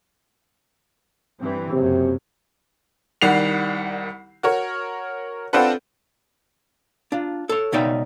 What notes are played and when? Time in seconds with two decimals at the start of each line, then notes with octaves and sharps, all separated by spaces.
1.40 G2 E3 C4
1.72 F#1 F#2 C3
3.22 C2 D#3 G3 F#5 C7 F7
4.43 F#4 A#4 C#5
5.53 C4 D4 F4 A4 B4 F#5
7.12 D4 F4
7.49 A4 C#5
7.72 C#2 B2 D#4 D5 E5 G5